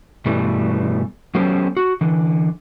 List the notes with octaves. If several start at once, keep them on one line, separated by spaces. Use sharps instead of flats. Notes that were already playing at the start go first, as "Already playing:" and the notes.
G2 B2 E3 G3 A3
F#3 B3 C#4 G4 A4 C5
F#4
D3 E3